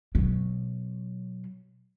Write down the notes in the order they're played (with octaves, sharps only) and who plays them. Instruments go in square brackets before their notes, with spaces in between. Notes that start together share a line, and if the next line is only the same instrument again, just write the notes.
[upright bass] B2 F#3